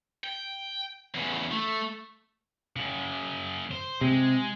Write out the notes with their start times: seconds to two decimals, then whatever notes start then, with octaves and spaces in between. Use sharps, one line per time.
0.24 G5
1.14 E2 C#3
1.51 A3
2.76 F#2 C#3
3.71 C5
4.01 C3 G#3